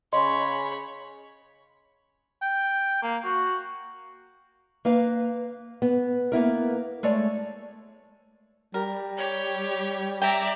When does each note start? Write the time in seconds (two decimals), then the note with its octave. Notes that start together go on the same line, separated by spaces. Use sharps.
0.13 C#3 C#5 D#5 B5 C6
2.42 G5
3.03 A#3
3.24 F#4
4.85 A#3 B4 F5
5.82 B3
6.32 A#3 B3 E4 A#4
7.03 G#3 A3 C#5 D5
8.74 G3 A#4
9.17 G4 C#5
10.22 D5 E5 G5 A#5